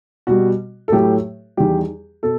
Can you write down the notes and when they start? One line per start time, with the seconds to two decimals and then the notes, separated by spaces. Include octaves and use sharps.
0.27 B2 G3 F#4
0.88 A4
0.92 A2 F#3 A3 G4
1.57 E2 D#3 G3 G4
2.23 B2 A4